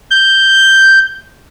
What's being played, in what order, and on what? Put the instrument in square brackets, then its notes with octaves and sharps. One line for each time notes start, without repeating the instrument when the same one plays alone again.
[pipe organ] G6